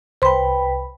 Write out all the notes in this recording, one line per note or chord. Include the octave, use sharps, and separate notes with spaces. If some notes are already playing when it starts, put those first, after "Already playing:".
C2 B4 C5 G5 B5 C6